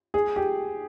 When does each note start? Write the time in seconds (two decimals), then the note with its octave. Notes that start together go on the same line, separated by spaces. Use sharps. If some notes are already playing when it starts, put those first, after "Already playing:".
0.14 G#4
0.36 G4